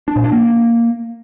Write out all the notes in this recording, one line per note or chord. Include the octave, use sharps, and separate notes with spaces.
D4
A#2
D4
A#3